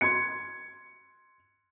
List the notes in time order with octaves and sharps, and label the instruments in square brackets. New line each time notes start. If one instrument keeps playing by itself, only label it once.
[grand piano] C6 G#6 C#7